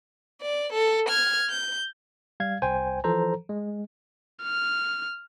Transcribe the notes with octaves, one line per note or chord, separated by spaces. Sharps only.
D5
A4
F6 G#6
G6
G3 F5 G#6
C2 C5 G5 G#5
E3 F3 A4 C5 A#5
G#3
F6